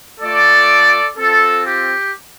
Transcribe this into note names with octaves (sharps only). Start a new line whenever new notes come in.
A3 F4 A4 D5
C4 F4 A4
G4